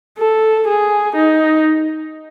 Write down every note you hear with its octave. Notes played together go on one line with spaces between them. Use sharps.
A4
G#4
D#4